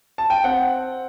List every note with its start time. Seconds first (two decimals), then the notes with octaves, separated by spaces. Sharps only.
0.18 A5
0.30 G5
0.44 C4 F#5